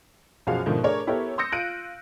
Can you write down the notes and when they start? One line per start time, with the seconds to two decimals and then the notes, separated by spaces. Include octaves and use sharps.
0.47 B1 F#2 F3 F#4 G#4 F5
0.66 G#2 B2 D3 D#3 F3 A3
0.83 A3 D4 G#4 A#4 C#5 D5
1.07 B3 E4 G4 A4 A#4 C#5
1.38 C6 D#6 E6 G6 A#6 C#7
1.52 F4 F#6 D7 D#7